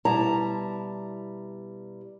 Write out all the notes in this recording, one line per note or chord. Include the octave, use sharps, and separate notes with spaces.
B2 G3 E4 A5 A#5